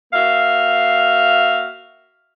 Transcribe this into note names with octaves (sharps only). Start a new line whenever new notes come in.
A#3 F#4 E5 F5